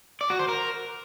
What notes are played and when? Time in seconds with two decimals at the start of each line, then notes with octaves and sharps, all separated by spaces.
0.21 D5
0.30 F#4
0.39 C5
0.48 A#4